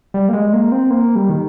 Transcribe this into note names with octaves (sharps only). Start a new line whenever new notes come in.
G3
A#3
G#3
A#3
C4
A#3
G3
D#3